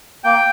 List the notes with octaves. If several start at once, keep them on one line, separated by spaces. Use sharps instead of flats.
A#3 G5